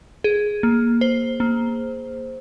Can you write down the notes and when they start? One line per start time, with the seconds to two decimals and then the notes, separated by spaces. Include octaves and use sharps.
0.24 G#4
0.63 A#3
1.01 C5
1.40 A#3